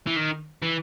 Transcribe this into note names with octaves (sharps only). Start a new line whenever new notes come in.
E3
D#3
E3